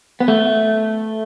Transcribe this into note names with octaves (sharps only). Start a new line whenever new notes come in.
B3
A3